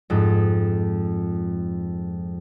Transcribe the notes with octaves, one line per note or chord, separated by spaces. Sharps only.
F2 G#2 G#3